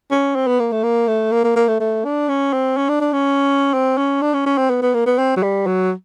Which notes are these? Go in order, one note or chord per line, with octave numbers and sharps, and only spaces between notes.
C#4
C4
B3
A#3
A3
A#3
A3
A#3
A#3
A#3
A3
A3
D4
C#4
C4
C#4
D4
D4
C#4
C4
C#4
D4
C#4
C#4
C4
B3
B3
A#3
B3
C4
F#3
G3
F#3